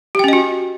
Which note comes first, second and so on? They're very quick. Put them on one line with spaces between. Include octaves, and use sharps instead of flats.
G4 G5 C#4 D#5 F#4